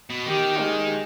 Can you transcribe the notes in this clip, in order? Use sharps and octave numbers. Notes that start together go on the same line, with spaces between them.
B2
D#3 G4
G#3